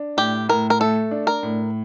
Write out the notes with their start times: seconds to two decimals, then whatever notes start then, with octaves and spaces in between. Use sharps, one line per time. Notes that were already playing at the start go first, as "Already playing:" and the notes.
Already playing: D4
0.17 A2 G4
0.49 A2 A#4
0.70 A#4
0.80 A3 A4
1.11 D4
1.27 A#4
1.43 A2